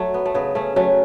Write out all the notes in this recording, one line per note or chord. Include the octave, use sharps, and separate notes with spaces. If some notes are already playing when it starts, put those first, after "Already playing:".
Already playing: F#3 A3
B3
A3
C#3 B3
A3 C#4
F#3 A3 C#4